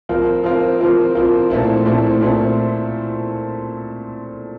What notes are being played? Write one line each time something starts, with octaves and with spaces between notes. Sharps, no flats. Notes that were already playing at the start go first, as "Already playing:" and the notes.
F3 C4 F4 A#4
F3 C4 F4 A#4
F3 C4 F4 A#4
F3 C4 F4 A#4
A#2 A3 C4 E4
A#2 A3 C4 E4
A#2 A3 C4 E4